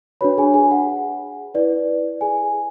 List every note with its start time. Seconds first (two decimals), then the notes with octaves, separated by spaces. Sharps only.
0.21 D4 F#4 B4 C#5 B5
0.38 G#4 G#5
0.54 G#4 G#5
0.71 F#5
1.55 E4 B4 D5
2.21 G#4 G#5